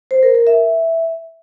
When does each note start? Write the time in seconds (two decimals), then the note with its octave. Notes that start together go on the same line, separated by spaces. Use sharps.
0.11 C5
0.23 A#4
0.35 A#4
0.47 E5